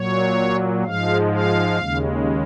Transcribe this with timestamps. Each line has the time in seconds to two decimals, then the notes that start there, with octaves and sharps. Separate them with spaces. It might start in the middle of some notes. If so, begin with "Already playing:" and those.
Already playing: A#2 F#3 C#5
0.84 G#2 F3 G#3 F5
1.32 F5
1.78 D#2 C#3 G#3